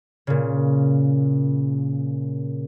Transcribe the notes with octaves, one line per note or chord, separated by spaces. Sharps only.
A#2 C#3